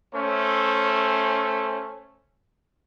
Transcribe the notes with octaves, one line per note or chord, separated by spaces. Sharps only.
A3 C#4 C5 E5